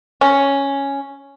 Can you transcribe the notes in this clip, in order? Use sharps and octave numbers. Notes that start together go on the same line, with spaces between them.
C#4